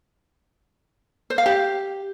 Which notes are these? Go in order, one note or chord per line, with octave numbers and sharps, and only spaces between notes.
C5
F5
G4